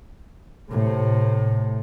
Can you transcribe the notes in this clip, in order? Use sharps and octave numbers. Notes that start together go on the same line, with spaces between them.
A2 C3